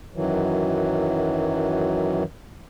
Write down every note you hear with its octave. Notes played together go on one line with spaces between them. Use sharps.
F#2 D#3 E3 F#3